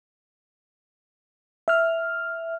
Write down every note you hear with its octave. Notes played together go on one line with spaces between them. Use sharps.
E5 F6